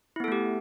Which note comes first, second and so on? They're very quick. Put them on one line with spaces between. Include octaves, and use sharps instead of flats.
E4 B3 A4 A3 G4